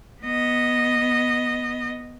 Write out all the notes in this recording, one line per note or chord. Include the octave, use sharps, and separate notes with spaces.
B3 D#5